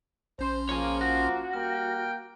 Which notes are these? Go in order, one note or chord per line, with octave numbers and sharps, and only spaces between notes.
A#1 C#4 C5 C6
F3 A#3 G#4 C#5
F#4
G3 A#3 G5 F6